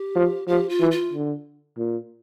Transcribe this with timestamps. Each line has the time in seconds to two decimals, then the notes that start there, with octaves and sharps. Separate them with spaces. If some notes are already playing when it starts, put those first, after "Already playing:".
Already playing: G4
0.15 F3
0.48 F3 G4
0.69 F4
0.80 E3
0.91 F4
1.13 D3
1.78 A#2